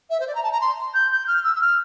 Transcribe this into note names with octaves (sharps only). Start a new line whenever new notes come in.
E5
C5
D5
A#5
A5
A#5
C6
G6
G6
F6
E6
E6
F6